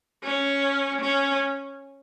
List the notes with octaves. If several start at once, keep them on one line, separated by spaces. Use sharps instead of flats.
C#4
C#4